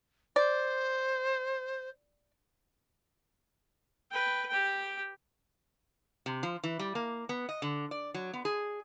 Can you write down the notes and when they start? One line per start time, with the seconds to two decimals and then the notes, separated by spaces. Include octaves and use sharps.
0.36 C5 D5
4.11 B4 G5
4.49 G4 G5
6.26 C3
6.43 F3
6.64 E3
6.79 G3
6.95 A#3
7.29 B3
7.49 D#5
7.62 D3
7.91 D5
8.14 F#3
8.34 B3
8.45 G#4